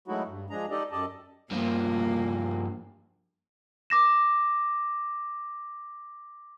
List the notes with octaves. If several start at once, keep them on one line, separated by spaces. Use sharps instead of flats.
F#3 G#3 A3 D#4 E4 F#4
G2
F3 G#3 D4 G#4 A#5
D#4 G4 A4 D5 D#5
F#2 G4 A4 D5 D#5 A5
G2 F3 A#3
D6 A#6 E7